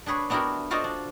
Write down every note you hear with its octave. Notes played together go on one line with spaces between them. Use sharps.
D4 G#4 B4 C#5
B3 D4 E4 F#4 G4 A#4
F4 F#4 A4 C5 D5 D#5
D4